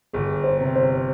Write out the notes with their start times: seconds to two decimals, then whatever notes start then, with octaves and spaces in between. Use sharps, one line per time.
0.13 G1 G#4
0.44 C5
0.60 C3
0.76 C5